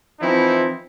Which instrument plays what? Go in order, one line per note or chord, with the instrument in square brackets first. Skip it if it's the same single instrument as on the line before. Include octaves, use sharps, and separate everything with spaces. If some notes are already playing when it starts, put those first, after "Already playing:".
[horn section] E3 F3 C4 D#4 E4